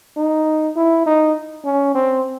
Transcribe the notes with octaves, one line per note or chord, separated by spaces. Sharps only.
D#4
E4
D#4
C#4
C4